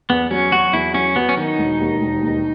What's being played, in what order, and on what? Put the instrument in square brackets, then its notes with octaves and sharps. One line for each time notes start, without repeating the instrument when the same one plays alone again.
[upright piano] E2 [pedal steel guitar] B3
[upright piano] F#3 [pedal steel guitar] C#4
[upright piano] F#3 [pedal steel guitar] F#4
[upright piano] E2 [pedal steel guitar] E4
[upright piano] F#3 [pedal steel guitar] C#4
[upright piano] F#3 [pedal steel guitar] B3
[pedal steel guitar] C#4
[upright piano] D#3 [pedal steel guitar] D#4
[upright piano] E1
D#2
E1
D#2